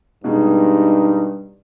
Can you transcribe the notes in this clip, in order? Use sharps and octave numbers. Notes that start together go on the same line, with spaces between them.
G2 B2 G#3 D#4